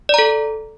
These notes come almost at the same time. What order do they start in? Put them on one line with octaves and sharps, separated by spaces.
D5 A#5 A4